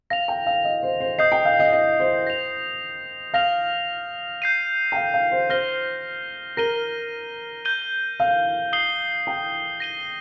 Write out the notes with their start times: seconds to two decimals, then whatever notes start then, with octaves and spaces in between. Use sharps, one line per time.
0.10 F5 A#6 F7
0.28 G5
0.46 F5
0.64 D#5
0.83 C5
1.00 C5
1.18 D#5 D#6 G6 C7
1.32 G5
1.45 F5
1.60 D#5
1.73 D#5
2.00 C5
2.27 A#6 F7
3.34 F5 F6 A#6 F7
4.42 G6 C7 D#7
4.92 G5
4.96 F5
5.14 F5
5.32 C5
5.49 C5 F6 A#6 G7
6.57 A#4 A#6 D#7 G7
7.65 G6 D#7 G7
8.20 F5
8.73 D#6 C7 G7
9.27 G5
9.80 A#6 D#7 G7